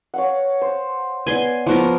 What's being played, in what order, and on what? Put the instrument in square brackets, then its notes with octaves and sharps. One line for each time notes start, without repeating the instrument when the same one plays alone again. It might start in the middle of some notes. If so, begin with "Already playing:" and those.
[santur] C#5 F5 F#5
C5
[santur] B3 D5 [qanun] G#5 C6
[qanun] F3 B3 A#4 [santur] C5 C#6 D6